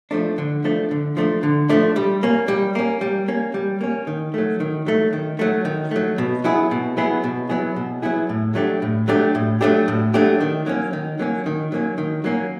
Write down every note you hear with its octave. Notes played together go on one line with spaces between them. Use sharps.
F3 A3 D4
D3
F3 A3 D4
D3
F3 A3 D4
D3
F3 A3 D4
G3
A#3 C#4
G3
A#3 C#4
G3
A#3 C#4
G3
A#3 C#4
D#3
F#3 A3
D#3
F#3 A3
D#3
F#3 A3
D#3
F#3 A3
B2
F#3 B3 E4 G#4
B2
F#3 B3 E4 G#4
B2
F#3 B3 E4 G#4
B2
F#3 B3 E4 G#4
A2
F#3 A3 D4 G4
A2
F#3 A3 D4 G4
A2
F#3 A3 D4 G4
A2
F#3 A3 D4 G4
D#3
F#3 A#3 C#4
D#3
F#3 A#3 C#4
D#3
F#3 A#3 C#4
D#3
F#3 A#3 C#4